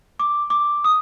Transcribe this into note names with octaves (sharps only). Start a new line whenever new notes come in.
D6
D6
D#6